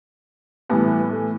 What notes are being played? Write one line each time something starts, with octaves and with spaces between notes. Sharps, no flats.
A2 E3 G3 B3
A3